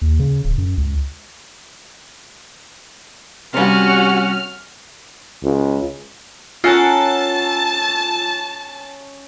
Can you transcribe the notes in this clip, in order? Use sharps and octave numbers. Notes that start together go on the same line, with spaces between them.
D#2
C#3
D1
F#2
C#2
C3 G3 C#4 F#4 F6
C#2
C#4 F4 A4 A#4 F#5 G#5 A5 A6